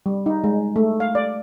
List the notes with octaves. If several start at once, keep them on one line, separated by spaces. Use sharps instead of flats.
G3
D#4
G#3
A3
F5
D5